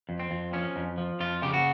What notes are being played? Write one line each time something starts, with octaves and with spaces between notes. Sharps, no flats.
F2
C4
F2
F3 C#4
F2
F3
F2 F4
C#3 G4
F#4